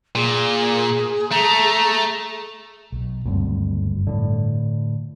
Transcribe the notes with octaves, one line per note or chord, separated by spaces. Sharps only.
A#2 G#4
A3 A#5
B1
F#1 D2 G2 G3 C4
A2 D3